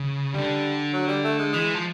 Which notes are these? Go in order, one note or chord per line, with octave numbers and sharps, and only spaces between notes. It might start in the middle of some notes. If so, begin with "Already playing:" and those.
Already playing: C#3
D3 G3
F#3
G3
A3
G#3
E3 G#3
F3